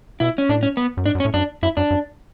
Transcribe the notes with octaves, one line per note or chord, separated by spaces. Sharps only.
B2 E4
C#4
A2 D4
C#4
B3
F#2
G#2 D4
F#2
C#4
A2
F#2 D4
F#2 E4
F#2 D4
F#2